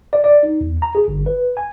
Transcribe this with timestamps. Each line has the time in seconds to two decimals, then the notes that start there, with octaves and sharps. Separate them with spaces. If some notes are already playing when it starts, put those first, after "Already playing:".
0.13 D5
0.24 D5
0.43 D#4
0.61 E2
0.82 A#5
0.95 G#4
1.08 G1
1.26 B4
1.57 G#5